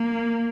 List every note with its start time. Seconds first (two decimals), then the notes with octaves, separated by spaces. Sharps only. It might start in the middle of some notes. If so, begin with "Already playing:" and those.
Already playing: A#3